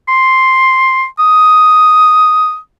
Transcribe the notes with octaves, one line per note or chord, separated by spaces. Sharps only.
C6
D#6